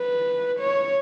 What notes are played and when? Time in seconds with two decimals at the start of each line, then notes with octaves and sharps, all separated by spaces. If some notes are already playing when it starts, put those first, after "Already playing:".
Already playing: B4
0.60 C#5